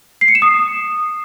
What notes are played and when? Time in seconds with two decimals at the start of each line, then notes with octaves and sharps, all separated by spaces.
0.21 C7
0.28 C#7
0.35 E7
0.42 D#6